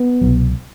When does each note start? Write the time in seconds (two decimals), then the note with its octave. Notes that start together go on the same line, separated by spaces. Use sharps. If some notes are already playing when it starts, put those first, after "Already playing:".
Already playing: B3
0.22 C2 B2 F#3